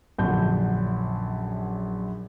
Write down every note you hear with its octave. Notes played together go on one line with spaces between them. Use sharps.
A#1 F#2 D3 F#4 G6